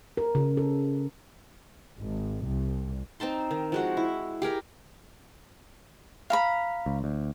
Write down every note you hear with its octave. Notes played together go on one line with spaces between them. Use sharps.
A#4
C#3
A4
G#1
C2
C4 D#4 A5 C6
D#3
F3 G#3 F#4
E4
G4 G#4 A#4 G#5
F5 A#5 B5
C#2
D2